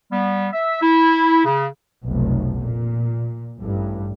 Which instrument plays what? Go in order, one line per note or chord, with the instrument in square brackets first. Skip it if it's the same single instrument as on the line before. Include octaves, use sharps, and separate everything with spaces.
[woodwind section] G3 B3
E5
E4
C#3
[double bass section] F1 B1
A#2
A1 G2